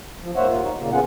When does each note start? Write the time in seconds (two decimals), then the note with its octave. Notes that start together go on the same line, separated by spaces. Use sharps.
0.22 F3
0.36 G#2 A#3 C5 C#5 E5 F#5
0.48 D#2 A#3 F4
0.62 D#4
0.77 A#2 C#3 A#3
0.92 B3 C#4 F4 G#4 F#5